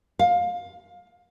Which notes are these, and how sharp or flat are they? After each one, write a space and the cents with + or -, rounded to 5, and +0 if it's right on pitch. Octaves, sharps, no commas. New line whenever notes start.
F5 +20